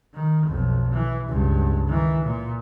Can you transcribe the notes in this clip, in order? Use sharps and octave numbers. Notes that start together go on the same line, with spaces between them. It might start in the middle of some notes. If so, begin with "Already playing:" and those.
D#3
B1 F2
E3
C#2 G2
D#3 E3
A#2